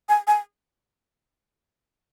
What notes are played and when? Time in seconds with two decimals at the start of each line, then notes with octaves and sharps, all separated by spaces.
0.09 G#5
0.27 G#5